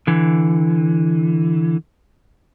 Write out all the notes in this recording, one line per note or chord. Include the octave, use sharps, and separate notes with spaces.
D3 E3